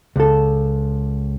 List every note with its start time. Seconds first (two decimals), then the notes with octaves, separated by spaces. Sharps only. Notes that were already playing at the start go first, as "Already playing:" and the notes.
0.16 C#2 A4